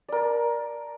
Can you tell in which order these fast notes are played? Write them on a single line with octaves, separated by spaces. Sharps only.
D5 A#4 A5